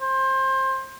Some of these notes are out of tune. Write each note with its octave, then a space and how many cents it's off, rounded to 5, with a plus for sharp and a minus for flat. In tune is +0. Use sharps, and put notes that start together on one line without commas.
C5 +25